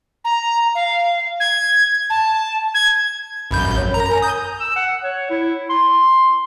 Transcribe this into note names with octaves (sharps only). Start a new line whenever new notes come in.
A#5
F5
G#6
A5
G#6
A1 F#2 B5 G6
C#5
A#4 A#5
G#5
D#6 G6
E6
F#5
C#5
E4
C6